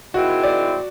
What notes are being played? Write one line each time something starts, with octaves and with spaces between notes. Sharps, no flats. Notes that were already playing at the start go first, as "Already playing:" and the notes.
D#3 G#3 C4 E4 F#4
D5